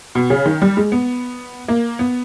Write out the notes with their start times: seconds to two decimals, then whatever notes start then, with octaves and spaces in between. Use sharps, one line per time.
0.15 B2
0.30 C#3
0.46 D#3
0.62 G3
0.77 G#3
0.92 B3
1.68 A#3
1.99 B3